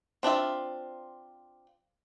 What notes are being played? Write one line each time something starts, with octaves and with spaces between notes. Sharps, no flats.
C4 D4 F4 E5